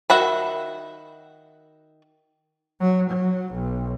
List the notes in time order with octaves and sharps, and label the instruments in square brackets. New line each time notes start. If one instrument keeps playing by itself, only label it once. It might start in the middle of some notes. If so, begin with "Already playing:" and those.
[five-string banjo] D#3 F#4 E5 F#5 B5
[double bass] F#3
F#3
B1